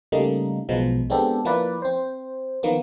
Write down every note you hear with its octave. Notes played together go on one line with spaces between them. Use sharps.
C#3 G3 A3 A#3 D#4
B1 B2 F3 G#3
G#3 B3 C4 D4 G4 A4
F3 A#3 E4 B4 D5
C4 C5
D#3 F3 A#3 B3